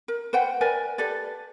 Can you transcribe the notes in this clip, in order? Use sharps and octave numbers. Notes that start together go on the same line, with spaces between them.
A#4
B4 C5 F#5 G5
A#4 B4 D5 G#5
G4 A4 B4 D5